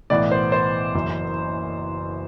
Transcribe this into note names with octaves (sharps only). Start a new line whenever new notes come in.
B1 A2 E3 B3 D5
C5
C5
F#1 F#2 E3